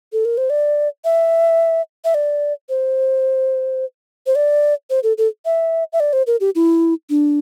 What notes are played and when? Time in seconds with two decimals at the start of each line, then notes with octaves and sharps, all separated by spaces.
0.13 A4
0.25 A#4
0.38 C5
0.50 D5
1.05 E5
2.05 E5
2.14 D5
2.69 C5
4.27 C5
4.35 D5
4.90 C5
5.03 A4
5.18 A4
5.45 E5
5.93 E5
6.00 D5
6.13 C5
6.27 A#4
6.40 G4
6.55 E4
7.10 D4